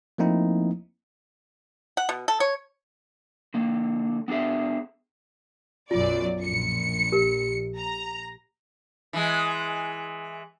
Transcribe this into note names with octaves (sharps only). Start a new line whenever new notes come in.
F3 A3 A#3 C4 D#4 E4
F#5
B2
A4
C#5
D3 A#3
B3 D4 G4 G#4 E5
B1 F#2 F4 D5
A#1 C#7
G4 A#4
A#5
E3 G#3